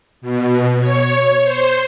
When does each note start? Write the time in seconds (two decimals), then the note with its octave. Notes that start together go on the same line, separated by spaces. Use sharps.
0.21 B2
0.79 C#5
1.43 C5